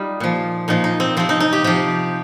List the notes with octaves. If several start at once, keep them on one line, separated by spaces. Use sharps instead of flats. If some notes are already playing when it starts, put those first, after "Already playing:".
Already playing: G3 D#4 F4
A#2 F3
A#2 F3 D#4
D#4
C4
C3 F3 C4
D#4
D#4
G4
C3 F3 G4